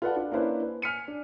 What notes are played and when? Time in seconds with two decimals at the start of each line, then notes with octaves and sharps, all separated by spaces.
0.02 F4 A4 B4 D5 F#5 A5
0.17 D4 F4
0.32 A#3 C#4 D4 E4 B4 C5
0.63 B4
0.82 G#5 F6 B6 C#7 D#7
1.08 D4